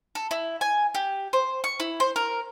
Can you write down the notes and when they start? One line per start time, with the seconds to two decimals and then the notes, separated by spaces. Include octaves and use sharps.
0.15 A4
0.31 E4
0.61 G#5
0.95 G4
1.33 C5
1.64 C#6
1.80 E4
2.00 C5
2.16 A#4